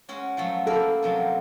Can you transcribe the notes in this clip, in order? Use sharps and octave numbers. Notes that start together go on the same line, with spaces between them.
G#3 C#4 F#4
F3 F#3 A3
A#3 E4 A4 A#4
C3 F3 F#3